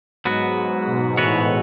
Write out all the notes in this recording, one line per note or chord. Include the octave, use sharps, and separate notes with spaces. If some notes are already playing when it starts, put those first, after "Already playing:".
G#2 F#3 B3 F#4
G#2
B2
A2 E3 B3 F#4 C#5